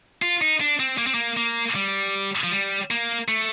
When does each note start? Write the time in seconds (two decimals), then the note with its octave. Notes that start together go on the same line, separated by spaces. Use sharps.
0.22 F4
0.42 D#4
0.60 D4
0.80 C4
0.98 A#3
1.07 C4
1.14 A#3
1.37 A#3
1.75 G3
2.44 F3
2.51 G3
2.91 A#3
3.28 A3